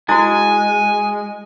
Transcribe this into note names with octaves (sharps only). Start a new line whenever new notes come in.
G#3 E4 F#4 G#5